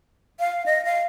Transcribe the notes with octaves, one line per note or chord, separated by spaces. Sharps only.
F5
D#5
F5